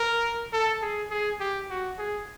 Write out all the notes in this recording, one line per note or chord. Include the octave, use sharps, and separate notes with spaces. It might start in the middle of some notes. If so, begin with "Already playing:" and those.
Already playing: A#4
A4
G#4
G#4
G4
F#4
G#4